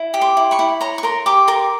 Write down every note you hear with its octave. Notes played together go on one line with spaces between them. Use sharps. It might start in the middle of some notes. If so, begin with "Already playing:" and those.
Already playing: E4
G4
C6 D6
E4
B5 C#6
E4
C#5 A#5 C6
C#6
A#4 A#5 C6
G4 C6 D6
A#4 C6 D6